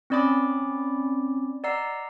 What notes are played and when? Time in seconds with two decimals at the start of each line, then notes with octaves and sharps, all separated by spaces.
0.10 C4 C#4 D5 B5 D6 D#6
1.64 D5 D#5 F#5 A#5 E6 C7